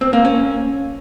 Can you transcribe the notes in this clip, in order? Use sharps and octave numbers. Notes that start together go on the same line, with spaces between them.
C4
A#3
C#4